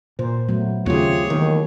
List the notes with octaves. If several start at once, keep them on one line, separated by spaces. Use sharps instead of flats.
A#2 C5
F#3 A3 B3
D#2 C#3 A3 C4 F4 G4 G#4 C#5
D#2 D#3 E3 B3 F4